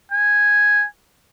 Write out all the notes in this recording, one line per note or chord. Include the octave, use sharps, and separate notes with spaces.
G#5